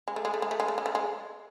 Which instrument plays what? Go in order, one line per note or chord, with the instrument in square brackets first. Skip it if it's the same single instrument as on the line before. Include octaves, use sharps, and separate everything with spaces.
[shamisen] G#3
A3
G#3
A3
G#3
A3
G#3
A3
G#3
A3
G#3